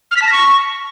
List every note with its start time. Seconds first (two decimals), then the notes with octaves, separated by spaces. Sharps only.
0.11 F6
0.17 B6
0.22 A5
0.27 A#6
0.32 C#6